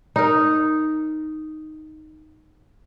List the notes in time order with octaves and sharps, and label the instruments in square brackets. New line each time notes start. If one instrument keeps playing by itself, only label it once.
[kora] D#4 A#4